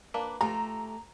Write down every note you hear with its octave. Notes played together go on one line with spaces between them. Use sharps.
A#3 D4 B4
A3 F4 G4 A4 A#5